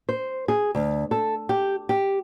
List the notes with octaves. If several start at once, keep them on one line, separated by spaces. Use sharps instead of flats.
C5
G#4
D2
A4
G4
G4